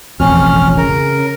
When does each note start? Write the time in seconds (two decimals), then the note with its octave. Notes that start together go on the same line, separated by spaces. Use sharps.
0.20 E1 A1 F2 C#4 F6
0.77 C#3 A#4